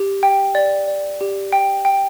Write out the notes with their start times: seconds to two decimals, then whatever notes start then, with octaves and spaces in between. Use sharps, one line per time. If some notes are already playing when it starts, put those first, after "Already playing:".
Already playing: G4
0.23 G5
0.55 D5
0.88 D5
1.21 G4
1.53 G5
1.85 G5